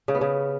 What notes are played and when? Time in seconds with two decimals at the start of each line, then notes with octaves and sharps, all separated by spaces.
0.08 C#3
0.15 B3
0.21 C#3